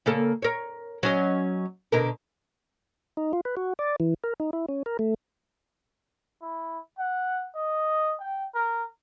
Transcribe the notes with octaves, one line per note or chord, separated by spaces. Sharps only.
C#3 A#3 A4
A#4 C#5
F#3 C#4 D#5
B2 D3 A#4
D#4
F4
B4
F#4
D5
E3
A#4
D#4
E4
C#4
A#4
A3
E4
F#5
D#5
G5
A#4